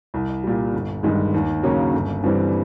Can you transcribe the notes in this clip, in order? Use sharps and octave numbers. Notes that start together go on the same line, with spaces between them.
C2
A#2 G3
G1
G2 D#3 G#3
D#2
C#3 F#3 A#3 C#4
G1
G2 E3 G3 C4